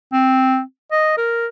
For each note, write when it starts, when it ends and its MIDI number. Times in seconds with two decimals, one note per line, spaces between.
0.13 0.61 60
0.91 1.16 75
1.17 1.47 70